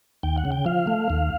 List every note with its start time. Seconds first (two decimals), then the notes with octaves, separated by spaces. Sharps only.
0.23 D#2 G5
0.38 F#5
0.45 C#3
0.52 G5
0.66 F3 F5
0.87 A3
1.10 D#2